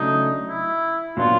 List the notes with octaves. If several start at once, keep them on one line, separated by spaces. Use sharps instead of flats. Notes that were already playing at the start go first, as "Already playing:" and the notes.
Already playing: C#3 F#3 A3 D4 D#4
E4
A#2 F#3 B3 D4 F4